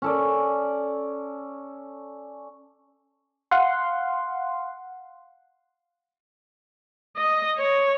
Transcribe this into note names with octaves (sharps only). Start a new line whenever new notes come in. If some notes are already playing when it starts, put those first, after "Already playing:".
C#4 A4 D5
F5 F#5 C6
D#5
C#5